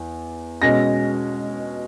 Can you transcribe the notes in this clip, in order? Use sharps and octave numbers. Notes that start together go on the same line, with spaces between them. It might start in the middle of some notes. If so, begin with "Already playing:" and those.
Already playing: E2
B2 G#3 C#4 A#6